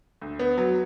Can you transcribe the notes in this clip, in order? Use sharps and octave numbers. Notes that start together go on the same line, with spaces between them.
D2
B3
F#3